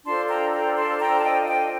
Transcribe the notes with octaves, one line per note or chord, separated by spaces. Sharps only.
D4 F4 A4 C5 A5 C6
G5 A#5
G5 A#5
A5 C6
G5 A#5
A5
D#5 G5
D#5 G5